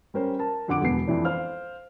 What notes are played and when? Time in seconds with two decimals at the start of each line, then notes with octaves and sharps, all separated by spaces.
0.14 G3 C#4 A#4 C5
0.39 A#4 A5
0.68 F2 D3 F#5 D6 D7
0.82 E1 B2 B3 C7
1.08 F2 E3 D4
1.25 C5 F5 F6